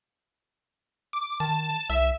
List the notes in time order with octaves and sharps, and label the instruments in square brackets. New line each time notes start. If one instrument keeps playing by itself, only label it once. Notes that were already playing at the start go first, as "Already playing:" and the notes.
[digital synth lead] D6
[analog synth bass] D#3 [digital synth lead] A5
[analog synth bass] C2 [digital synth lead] E5